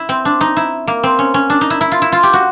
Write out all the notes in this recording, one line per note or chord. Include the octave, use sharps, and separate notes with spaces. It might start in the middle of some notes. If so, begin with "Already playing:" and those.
Already playing: E4
C4
D4
D#4
E4
A#3
C4
C#4
C#4
D4
D#4
E4
E4
F4
E4
F4
G4
F#4